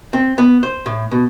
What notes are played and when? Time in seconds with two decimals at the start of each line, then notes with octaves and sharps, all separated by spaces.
0.13 C4
0.38 B3
0.63 C5
0.86 A2
1.11 B2